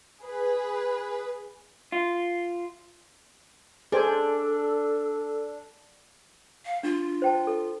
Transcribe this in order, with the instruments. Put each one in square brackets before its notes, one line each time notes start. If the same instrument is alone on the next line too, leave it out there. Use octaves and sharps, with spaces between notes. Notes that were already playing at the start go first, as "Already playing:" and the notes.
[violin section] G#4 B4
[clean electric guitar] F4
[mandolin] D4 [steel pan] G#4 C5 G#5 [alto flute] A4
[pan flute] F5
[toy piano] D4 [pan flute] F4
[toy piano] C5 G5 A5
A4